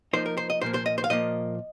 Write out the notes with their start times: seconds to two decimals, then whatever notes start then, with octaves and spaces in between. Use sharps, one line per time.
0.13 F3 A#3 D#4 C5
0.26 A#4
0.37 C5
0.50 D#5
0.61 A#2 F3 A#3 C5
0.74 C5
0.86 D#5
0.98 C5
1.04 F5
1.10 A#2 F3 A#3 D#5